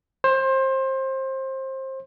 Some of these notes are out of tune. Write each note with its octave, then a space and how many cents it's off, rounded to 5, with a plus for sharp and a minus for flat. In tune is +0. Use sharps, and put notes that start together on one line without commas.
C5 +25